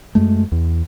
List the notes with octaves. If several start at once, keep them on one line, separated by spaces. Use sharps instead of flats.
F#2 G#3 A3
E2